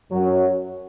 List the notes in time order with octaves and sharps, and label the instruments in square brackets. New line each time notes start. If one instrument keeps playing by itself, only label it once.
[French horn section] F#2 F#3